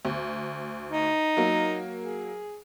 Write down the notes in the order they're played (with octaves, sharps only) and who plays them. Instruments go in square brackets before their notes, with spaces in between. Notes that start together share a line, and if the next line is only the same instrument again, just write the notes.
[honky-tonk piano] D2
[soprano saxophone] D#4
[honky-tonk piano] F#3 A#3
[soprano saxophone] G#4